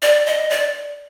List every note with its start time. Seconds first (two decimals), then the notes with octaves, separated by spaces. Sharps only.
0.02 D5
0.26 D#5
0.50 D5